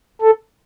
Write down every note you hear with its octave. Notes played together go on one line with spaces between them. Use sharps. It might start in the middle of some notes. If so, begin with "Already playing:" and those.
A4